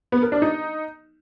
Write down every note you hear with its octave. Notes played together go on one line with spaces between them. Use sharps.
B3
A#4
D4
D#4